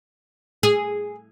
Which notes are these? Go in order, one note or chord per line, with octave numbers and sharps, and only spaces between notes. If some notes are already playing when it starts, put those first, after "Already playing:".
G#4